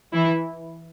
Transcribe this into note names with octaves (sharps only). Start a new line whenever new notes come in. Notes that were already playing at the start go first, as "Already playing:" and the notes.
E3 E4